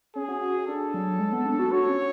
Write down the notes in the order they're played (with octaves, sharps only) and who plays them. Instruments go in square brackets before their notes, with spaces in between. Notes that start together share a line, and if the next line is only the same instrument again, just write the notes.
[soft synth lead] C#4 [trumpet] G#4
[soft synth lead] F#4
F#4
[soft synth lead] D4 [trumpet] A4
[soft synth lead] F#3
G#3
B3
D4
F#4
[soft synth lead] F#4 [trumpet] C#5
[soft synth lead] C#4